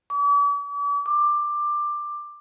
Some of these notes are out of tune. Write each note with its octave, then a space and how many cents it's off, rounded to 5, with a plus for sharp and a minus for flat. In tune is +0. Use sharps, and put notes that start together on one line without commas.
D6 -45
D6 +15